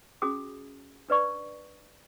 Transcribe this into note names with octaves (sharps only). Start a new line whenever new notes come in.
C#4 F#4 G#4 D#6
D4 B4 D5 C#6